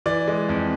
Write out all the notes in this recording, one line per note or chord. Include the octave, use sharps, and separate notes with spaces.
E3 D5
G#3
F2